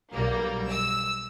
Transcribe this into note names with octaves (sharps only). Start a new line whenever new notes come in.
B1 G3 A#3
E6